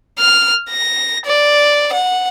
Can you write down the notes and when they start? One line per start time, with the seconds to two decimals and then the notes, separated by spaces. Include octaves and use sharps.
0.19 F6
0.70 A#6
1.26 D5
1.93 F#5